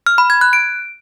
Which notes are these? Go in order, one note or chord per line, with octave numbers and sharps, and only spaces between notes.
F6
B5
G#6
F#6
D7